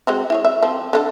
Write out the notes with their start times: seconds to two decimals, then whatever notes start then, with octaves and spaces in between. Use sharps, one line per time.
0.07 G#3 C4 F#4
0.30 E4 G#4 C#5
0.45 E5
0.63 F3 C4
0.93 D3 F4 A4